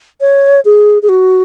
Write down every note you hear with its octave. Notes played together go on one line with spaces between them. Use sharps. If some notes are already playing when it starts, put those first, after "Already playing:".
C#5
G#4
G#4
F#4